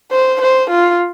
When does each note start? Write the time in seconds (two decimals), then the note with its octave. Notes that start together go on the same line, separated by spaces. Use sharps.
0.12 C5
0.42 C5
0.70 F4